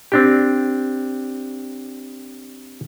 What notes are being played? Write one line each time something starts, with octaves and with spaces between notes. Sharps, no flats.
C4 D4 G4